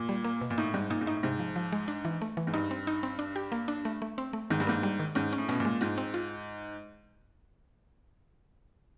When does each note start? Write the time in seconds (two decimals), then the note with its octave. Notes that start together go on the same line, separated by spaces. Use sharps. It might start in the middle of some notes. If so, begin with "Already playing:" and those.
Already playing: A#2
0.09 G3
0.24 A#3
0.41 B2
0.50 A#2
0.58 A2 D#4
0.74 G#2 G3
0.90 A#2 D#4
1.01 G#2
1.06 A2 D#4
1.23 G#2 C3
1.39 F3
1.56 F3
1.73 G#3
1.88 D4
2.05 E3
2.22 A3
2.37 E3
2.47 G#2
2.54 G2 D#4
2.71 C4
2.87 D#4
3.03 C4
3.19 D4
3.36 G4
3.52 A#3
3.68 D4
3.85 A3
4.02 A3
4.18 C4
4.33 A3
4.50 G#2 D#3
4.60 G2
4.67 G#2 A#3
4.83 G3
4.99 D#3
5.15 G#2 C#4
5.33 C#4
5.38 A2
5.48 B2 C#4
5.60 A#2
5.65 G#3
5.81 G#2 F4
5.98 C4
6.14 F4